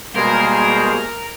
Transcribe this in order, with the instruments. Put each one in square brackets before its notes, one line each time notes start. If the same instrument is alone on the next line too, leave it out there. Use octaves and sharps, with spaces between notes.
[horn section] B2 G3 A#3 [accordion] G#3 G#4 C5 [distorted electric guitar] A#4